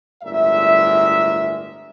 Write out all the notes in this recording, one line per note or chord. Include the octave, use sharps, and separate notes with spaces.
G1 A2 G#3 A#4 D5 E5